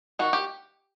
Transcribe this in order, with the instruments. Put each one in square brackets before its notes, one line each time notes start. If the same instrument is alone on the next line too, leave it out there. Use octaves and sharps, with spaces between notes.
[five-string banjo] D#3 F#4
G4